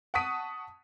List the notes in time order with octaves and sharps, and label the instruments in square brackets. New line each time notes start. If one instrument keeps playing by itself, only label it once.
[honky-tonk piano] F#5 A5 C#6 D#6 B6 D#7